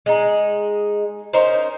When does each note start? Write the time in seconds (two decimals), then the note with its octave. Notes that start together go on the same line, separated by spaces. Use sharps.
0.06 G#3 D#4
1.33 C#4 D#4 A#4 C5